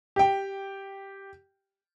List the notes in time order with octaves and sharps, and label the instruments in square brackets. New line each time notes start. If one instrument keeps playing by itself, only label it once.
[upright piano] G4 G5